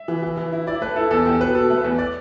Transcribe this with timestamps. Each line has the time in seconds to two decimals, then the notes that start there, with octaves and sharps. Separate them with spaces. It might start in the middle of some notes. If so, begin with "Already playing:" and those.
Already playing: E5
0.08 E3
0.23 E3
0.37 E3
0.52 E4
0.67 E4 D5
0.81 A3 B4
0.96 E4 A4
1.11 E2 A4
1.25 E2 G4
1.40 B2 B4
1.55 B2 A4
1.70 A3
1.78 B4
1.84 E2
1.98 D5